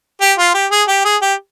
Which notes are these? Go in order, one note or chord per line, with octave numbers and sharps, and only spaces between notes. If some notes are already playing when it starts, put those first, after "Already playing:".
G4
F4
G4
G#4
G4
G#4
G4